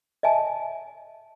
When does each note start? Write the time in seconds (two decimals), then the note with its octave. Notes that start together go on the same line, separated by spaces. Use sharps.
0.23 D#5 E5 G#5 A5